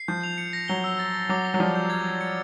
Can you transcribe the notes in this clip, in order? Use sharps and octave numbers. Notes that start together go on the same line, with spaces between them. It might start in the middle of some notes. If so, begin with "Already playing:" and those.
Already playing: C7
F3 G6
F7
C#7
A#6
F#3 G7
E6
A6
A6
F#3 D6
A#6
F#3
F3 G3 G6
G6
G#6
G#6
C#7